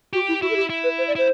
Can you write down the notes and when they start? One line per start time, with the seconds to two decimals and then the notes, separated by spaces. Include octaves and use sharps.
0.13 F#4 G4
0.28 E4
0.41 E4 F#4
0.50 A4
0.56 G4
0.70 E4
0.84 B4
0.98 C5
1.07 D5
1.15 E4 C5